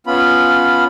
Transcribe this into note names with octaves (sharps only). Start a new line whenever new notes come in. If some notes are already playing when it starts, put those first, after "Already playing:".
B3 C#4 F4 B5